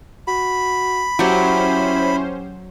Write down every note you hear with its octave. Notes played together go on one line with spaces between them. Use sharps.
F#4 B5
F#3 C#4 E4 G4 C5